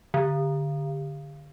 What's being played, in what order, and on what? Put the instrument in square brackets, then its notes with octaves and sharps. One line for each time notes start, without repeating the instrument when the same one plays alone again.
[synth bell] D3